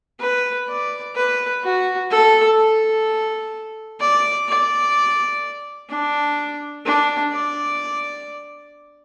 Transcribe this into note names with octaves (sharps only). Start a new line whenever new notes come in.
B4
D5
B4
F#4
A4
A4
D5
D5
D4
D4
D5